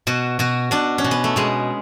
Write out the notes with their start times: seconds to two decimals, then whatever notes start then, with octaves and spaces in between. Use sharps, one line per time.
0.07 B2 F#4
0.39 B2 F#4
0.71 B2 D4
0.98 C#4
1.04 B2
1.11 B3
1.24 A3
1.36 B2 G#3